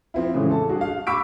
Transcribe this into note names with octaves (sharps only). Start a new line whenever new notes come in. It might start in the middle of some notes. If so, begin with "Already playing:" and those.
F3 C4 E4
A2 C#3 E3 G#3
A4 A5
G3 D4 F#4 G#4
F5
B5 C#6 D6 E6 B6 D7